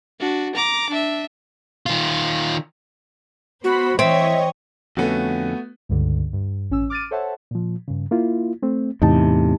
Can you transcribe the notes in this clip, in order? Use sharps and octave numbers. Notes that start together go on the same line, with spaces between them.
D4 F#4
A#5 D6
D4 E5
D#3 F4
B3 F#4 C5 B5
E3 C4 C#5 D#5 E5
F2 D3 A3 B3 C#4 F#4
C#2 G2 D3
G2
A1 C#4 E6
D6 F6 A6 D7 D#7
A4 C5 C#5 E5 F#5 A5
A#2 F3
G2 C#3
A#3 E4 F4
A3 C4
E2 A2 C3 D#4 G4 A5